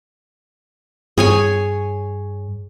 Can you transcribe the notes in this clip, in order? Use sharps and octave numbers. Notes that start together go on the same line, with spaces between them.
G2 G#4 C#5 G#5